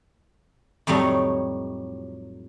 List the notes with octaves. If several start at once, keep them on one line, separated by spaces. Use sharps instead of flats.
F2 A2 F#3 G3 D#4 C#5